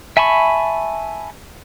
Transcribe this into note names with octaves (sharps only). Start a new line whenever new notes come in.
E5 G#5 A5 B5 C#6